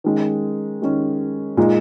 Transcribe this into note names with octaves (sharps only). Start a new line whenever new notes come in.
D#3 G#3 C#4
D#3 G#3 C#4
A#2 G#3 D#4